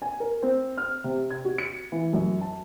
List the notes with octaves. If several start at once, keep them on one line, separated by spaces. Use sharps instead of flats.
G#5
A#4
C4
F6
C3
G#6
F#4
C#7
E3
F#2
A5